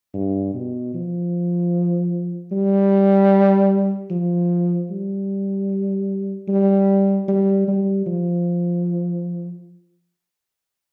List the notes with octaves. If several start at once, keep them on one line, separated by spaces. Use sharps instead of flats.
G2
B2
F3
G3
F3
G3
G3
G3
G3
F3